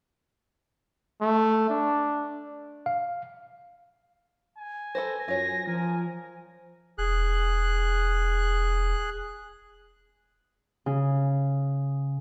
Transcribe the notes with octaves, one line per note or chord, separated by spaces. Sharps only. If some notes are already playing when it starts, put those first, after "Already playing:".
A3
D4
F5
G#5
A4 B4 C5 A#6
F#2 F4 C#5 A#6
F3 A#4 G#5
E1 G#4 F#6
C#3